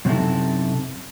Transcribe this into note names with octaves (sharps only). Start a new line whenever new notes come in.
F#2 C3 C4 D#4 E4 A4